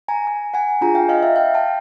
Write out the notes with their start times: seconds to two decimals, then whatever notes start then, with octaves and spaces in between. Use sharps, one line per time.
0.08 G#5 A#5
0.27 G#5 A#5
0.54 F#5 G#5
0.81 D4 F4 G#4 G#5 A#5
0.95 F5 G5
1.09 D#5 F5
1.23 E5 F#5
1.36 F5 G5
1.54 G5 A5